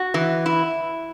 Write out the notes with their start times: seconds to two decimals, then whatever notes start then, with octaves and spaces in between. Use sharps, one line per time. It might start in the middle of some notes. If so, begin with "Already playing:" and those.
Already playing: F#4
0.14 E3
0.46 E4